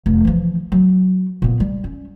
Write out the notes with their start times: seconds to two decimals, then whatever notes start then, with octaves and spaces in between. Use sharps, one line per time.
0.06 F1
0.25 E3 F3
0.72 F#3
1.42 A#2 B3
1.60 G3
1.84 C#4